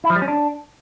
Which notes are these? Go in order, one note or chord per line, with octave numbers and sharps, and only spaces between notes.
E4
F3
G3
C#4
D4